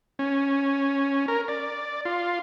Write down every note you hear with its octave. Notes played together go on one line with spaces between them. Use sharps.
C#4
A#4
D5
F4